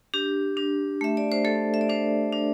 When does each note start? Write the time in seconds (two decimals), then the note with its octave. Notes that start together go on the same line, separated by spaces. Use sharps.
0.14 D4 G4
0.57 D4
1.01 A3 E5
1.17 D5
1.32 C5
1.45 A3 A4
1.74 E5
1.81 D5
1.89 D4 C5
2.32 D4